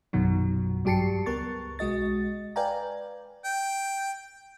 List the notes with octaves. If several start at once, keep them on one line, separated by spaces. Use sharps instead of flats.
A#1 F#2 B2 D#3 F#3
G2 F#3 G4 A5 C7 C#7
C#2 B3 A#4 C#6 A6
B1 G#3 F#4 D#5 A6
B4 D5 F5 G5 G#5 A#5
G5